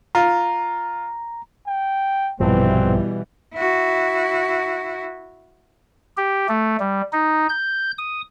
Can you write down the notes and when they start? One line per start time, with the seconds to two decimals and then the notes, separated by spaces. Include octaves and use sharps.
0.15 F4 A#5
1.67 G5
2.40 A#1 G2 B2 E3 F3 G3 C4
3.55 E4 F#4
6.17 G4
6.49 A3
6.80 G3
7.13 D#4
7.49 G6
7.98 D#6